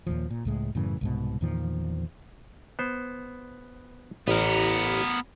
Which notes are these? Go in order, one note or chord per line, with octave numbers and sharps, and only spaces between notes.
D#2 A#2 F3
A#2
C#2 A2 G#3
F#2 A2 C#3 E3
C2 G#2 B2
E2 A#2 D#3 F3
B3 C5
A1 B3 A#4